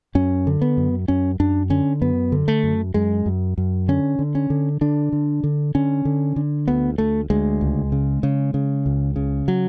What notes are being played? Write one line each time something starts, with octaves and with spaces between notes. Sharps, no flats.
F#2 C#4
D3
B3
F#2
F#2 C#4
F#2 D4
D3 C#4
F#2 B3
D3
A3
F#2
F#2 G#3
F#2
F#2
D3 C#4
D3
C#4
D3
D3 D4
D3
D3
D3 C#4
D3
D3
D2 B3
D2 A3
D2 G#3
C#2
C#3
C#3
C#3
C#2
C#3
F#3